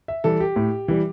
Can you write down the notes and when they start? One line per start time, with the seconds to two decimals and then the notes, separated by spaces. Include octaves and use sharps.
0.08 E5
0.24 E3 G3 A4
0.40 G4
0.56 A2
0.88 E3 G3